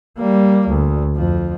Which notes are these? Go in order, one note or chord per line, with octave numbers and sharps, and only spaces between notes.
G3 A#3
D2
F2 F3